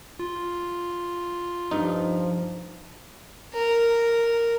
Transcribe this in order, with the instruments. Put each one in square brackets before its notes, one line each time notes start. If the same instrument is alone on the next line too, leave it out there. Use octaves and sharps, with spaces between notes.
[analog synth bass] F4
[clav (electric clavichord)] G2 D#4 [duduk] F3
[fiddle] A#4